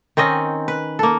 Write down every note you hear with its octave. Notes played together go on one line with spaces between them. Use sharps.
D#3 C4 C#4 D#5
B4
A#3 A4